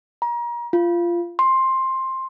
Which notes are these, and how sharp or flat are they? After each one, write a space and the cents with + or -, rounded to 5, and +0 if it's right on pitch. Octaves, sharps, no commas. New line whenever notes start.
A#5 +35
F4 -20
C6 +10